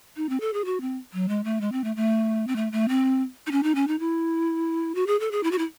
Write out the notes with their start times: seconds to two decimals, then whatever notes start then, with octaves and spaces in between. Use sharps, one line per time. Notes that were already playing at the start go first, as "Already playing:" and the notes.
0.17 D#4
0.29 C4
0.41 A4
0.53 G#4
0.65 F#4
0.81 C4
1.13 F#3
1.29 G#3
1.44 A3
1.61 G#3
1.72 C4
1.84 A3
1.96 A3
2.47 C4
2.56 A3
2.72 A3
2.88 C4
3.47 D#4
3.52 C#4
3.63 D#4
3.75 C#4
3.88 D#4
3.99 E4
4.95 F#4
5.07 G#4
5.20 A4
5.31 G#4
5.43 E4
5.51 F#4
5.58 E4